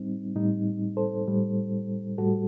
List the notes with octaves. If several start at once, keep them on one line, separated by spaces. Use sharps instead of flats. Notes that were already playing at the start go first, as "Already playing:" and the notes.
Already playing: A2 G3 C4 D#4
A2 G3 D#4
A4 C5
A2 G3
A2 G3 F#4 A4